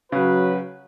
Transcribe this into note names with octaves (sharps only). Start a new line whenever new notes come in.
C#3 F#3 C#4 F#4 B4